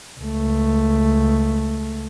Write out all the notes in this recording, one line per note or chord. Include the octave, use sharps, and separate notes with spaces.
C#2 A3